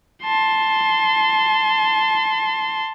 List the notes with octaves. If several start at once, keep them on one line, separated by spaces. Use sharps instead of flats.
A5 C6